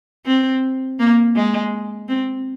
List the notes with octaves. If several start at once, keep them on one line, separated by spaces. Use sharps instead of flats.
C4
A#3
G#3
C4